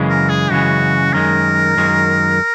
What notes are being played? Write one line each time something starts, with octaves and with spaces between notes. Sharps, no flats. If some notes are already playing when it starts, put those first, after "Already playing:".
Already playing: F#2 C#3 E3 G#3
A#4
G#4
F#2 C#3 E3 G#3 F#4
F#2 D#3 G#3 A#4
F#2 D#3 G#3